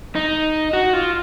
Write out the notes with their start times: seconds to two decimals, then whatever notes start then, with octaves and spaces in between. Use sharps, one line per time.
0.15 D#4
0.73 F#4
0.93 F4